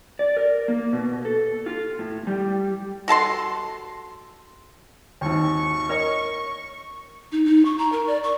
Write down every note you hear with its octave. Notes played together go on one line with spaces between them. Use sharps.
D5
A#4
A#3
B2
A4
F4
A2
G3
F#4 A4 A5 C6
G#1 D#2 C#6
A#4 C#5 D#5
D#4
D#4
C#6
A#5
A#4
D5
C#6